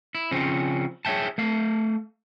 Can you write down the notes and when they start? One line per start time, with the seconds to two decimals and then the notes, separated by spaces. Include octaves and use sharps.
0.15 E4
0.31 C#3 F3 C4 C#4
1.05 G#4 C#5 D#5 E5 G5 A5
1.38 A3 F5